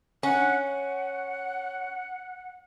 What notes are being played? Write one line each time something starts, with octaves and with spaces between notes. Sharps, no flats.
C#4 F#5
F#5